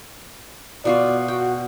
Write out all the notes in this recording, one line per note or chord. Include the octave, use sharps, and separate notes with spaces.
B2 F4 F#4 D5
F#4 G5